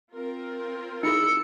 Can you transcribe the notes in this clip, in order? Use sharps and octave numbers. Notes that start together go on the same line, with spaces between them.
C4 F4 A#4
D#4 E4 G#4 E6 C#7